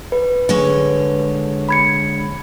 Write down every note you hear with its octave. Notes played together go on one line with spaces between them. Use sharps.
B4
D3 G#3 C#5
B5 G#6 C#7